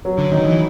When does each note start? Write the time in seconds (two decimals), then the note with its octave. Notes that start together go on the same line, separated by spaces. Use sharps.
0.05 F#3
0.18 D3
0.32 D#3 D#4
0.46 E3